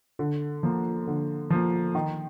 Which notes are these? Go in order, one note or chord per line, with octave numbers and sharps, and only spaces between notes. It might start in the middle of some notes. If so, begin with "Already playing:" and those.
D3
F3 A#3
D3
F3 A#3
D#3